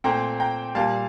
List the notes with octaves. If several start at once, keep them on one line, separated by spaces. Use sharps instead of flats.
A#2 A3 C4 G5 A#5
G5 A#5
A#2 G3 A#3 F5 A5